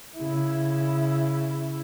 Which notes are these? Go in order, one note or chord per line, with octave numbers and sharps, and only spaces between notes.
C#3 E4